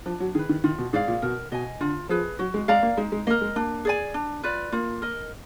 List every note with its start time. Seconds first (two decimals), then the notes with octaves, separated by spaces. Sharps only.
0.06 F3 D4
0.20 F#3
0.35 D#3 G#4
0.38 B4
0.49 D#3
0.64 D#3 F4
0.78 B2
0.93 G#2 G#4 D5 F5
1.08 A#2
1.22 B2 A#4
1.52 B2 D#5 G#5
1.80 D3 F4
2.09 F3 G#4 B4
2.39 F#3 F#4
2.54 G#3
2.68 G#3 D5 F5 A#5
2.83 A#3
2.97 G#3 D#4
3.12 G#3
3.27 A#3 D#5
3.30 A#4
3.41 G#3
3.56 A#3 D4
3.85 G#4 D5 G#5
4.14 D4
4.43 F4 B4 D5
4.72 A#3 F4
5.02 A#4 D#5